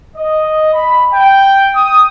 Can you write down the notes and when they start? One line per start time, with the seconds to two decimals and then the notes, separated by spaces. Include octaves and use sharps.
0.16 D#5
0.73 B5
1.12 G5
1.75 D#6